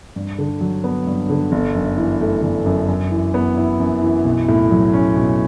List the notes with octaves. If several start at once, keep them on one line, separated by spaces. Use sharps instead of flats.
G2
D3
F#3
B3
G2
D3
G1
F#2
E3
A3
G1
F#2
F#2
E3
B3
E4
F#2
E3
B1
A2
F#3
C#4
B1